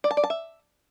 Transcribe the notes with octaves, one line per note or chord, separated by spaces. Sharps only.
D5
A5
D5
A5
E5